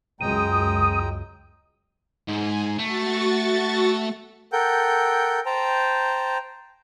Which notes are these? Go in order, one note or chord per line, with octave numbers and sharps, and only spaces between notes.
C#2 F#2 G#3 G5 A#5 D#6
G#2 G#5
A3 F#4 C#6 A6
A4 A#4 F#5 G5 G6
C5 G5 A5 A#5